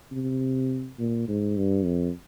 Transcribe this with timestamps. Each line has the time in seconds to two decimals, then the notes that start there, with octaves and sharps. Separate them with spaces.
0.12 C3
0.99 A#2
1.28 G#2
1.57 G2
1.85 F2